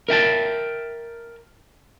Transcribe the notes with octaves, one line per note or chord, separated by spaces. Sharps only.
A#4 E5 G5 A5